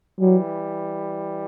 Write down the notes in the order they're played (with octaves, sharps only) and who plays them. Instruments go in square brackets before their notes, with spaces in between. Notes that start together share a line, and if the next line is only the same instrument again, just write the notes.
[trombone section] E3 G3 [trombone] F#3